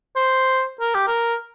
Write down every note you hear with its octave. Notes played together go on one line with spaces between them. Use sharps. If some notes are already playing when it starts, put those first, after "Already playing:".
C5
A#4
G4
A#4